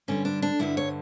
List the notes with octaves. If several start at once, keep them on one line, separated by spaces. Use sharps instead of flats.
G2 D3 G3 C#4
D4
D4
G2 D3 G3 E4
C#5